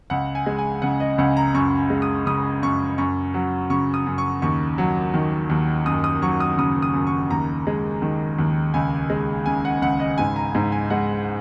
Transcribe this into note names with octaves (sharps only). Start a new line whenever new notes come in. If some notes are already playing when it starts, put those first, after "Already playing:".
C#2 F#5
G#5
G#3
G#5
C#3 F#5
D#5
C#2 F#5
A#5
F#2 C#6
G#3
D#6
C#3 D#6
F#2 C#6
F#2 C#6
F#3
C#3 C#6
D#6
F#2
C#6
D#2 C#6
F#3
D#3
D#2
F#2 D#6
D#6
F#3 C#6
D#6
C#3 D#6
D#6
F#2
C#6
D#2 A#5
G#3
D#3
D#2
C#2 G#5
G#3
C#3 G#5
F#5
C#2 F#5
D#5
G#2 G#5
A#5
G#2 A#5
G#5
G#3 F#5